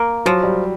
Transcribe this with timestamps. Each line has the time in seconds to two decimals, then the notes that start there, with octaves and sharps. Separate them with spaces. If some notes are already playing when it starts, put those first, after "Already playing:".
Already playing: A#3
0.25 F3 F#3
0.43 G3